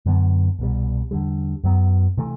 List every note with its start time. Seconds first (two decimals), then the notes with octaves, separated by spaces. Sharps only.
0.06 F#2 D3 F#3 B3
0.59 C2 B2 G3
1.11 E2 D3 G3
1.64 F#2 F#3 B3
2.17 C3 E3 A3